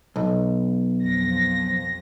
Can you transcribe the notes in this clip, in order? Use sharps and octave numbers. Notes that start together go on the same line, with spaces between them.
B1
F2 A#6